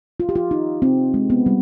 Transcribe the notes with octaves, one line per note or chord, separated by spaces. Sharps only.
F4
G4
F4
D#4
C4
G#3
B3
G3